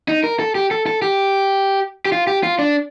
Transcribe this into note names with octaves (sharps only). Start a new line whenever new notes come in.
D#4
A#4
A4
G4
A4
A4
G4
G4
F4
G4
F4
D4